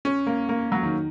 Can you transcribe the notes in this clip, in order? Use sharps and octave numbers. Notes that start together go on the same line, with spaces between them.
C#4
A#3
A#3
F#3
D#3